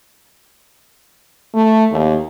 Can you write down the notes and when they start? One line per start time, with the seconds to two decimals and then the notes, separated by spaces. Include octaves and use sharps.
1.54 A3
1.91 D#2